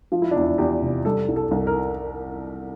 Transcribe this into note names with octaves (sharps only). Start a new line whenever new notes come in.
F3 F4
E4
E2 D4
E4
E2 G4
C3
G3 A4
C2
A4
C2
A#4